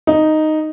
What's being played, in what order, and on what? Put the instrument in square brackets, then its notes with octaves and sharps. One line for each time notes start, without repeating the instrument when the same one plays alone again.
[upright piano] D#4